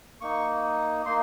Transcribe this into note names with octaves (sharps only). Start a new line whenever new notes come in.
A#3 D#4 C#6
A#3 D#4 C6